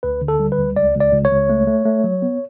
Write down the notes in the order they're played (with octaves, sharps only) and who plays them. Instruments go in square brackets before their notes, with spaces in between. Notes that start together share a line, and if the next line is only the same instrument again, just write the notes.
[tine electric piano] D2 B4
D3
A4
G3
B4
D2
C#2 D5
C#2
D5
C#2
C#5
C#2
A3
A3
A3
F#3
B3